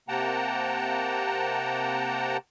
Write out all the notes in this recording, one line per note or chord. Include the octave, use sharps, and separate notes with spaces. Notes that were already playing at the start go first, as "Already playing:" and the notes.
C3 A#3 F#5 G5 A5 A#5